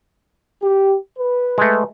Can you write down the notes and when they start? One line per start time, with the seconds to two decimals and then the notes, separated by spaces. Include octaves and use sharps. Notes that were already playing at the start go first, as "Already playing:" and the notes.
0.62 G4
1.17 B4
1.58 G#3 A3